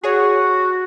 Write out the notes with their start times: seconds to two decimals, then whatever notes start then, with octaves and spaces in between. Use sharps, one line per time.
0.04 F#4 G#4 C#5